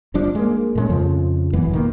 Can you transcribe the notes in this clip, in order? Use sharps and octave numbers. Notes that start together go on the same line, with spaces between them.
G1 G2 F3 D4
G#3 A#3
A#2 G#3 C#4
F2 C#3 F3
G#1 F#2 E3 B3
B2 D#3 A#3